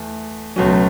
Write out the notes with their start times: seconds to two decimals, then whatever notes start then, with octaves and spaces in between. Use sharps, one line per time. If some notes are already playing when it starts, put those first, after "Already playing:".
Already playing: E2 A3
0.56 C#2 B2 F#3 A3 C#4